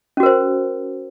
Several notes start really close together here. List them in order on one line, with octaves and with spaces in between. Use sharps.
C#4 F#4 A#4 C5